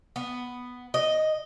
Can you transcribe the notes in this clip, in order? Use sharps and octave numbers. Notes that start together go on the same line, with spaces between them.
B3
D#5